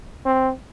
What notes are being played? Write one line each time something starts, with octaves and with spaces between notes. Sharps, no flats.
C4